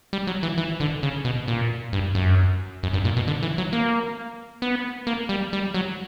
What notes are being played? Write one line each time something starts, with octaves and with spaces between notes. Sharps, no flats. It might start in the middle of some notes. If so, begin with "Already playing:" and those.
G3
F#3
E3
E3
D3
C#3
B2
A#2
G2
F#2
F#2
G2
A#2
B2
D3
E3
F#3
A#3
B3
A#3
G3
G3
F#3